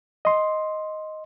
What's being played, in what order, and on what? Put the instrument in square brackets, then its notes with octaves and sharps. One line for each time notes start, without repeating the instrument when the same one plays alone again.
[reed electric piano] D#5 C6